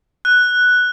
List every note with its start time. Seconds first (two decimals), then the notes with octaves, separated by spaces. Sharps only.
0.25 F#6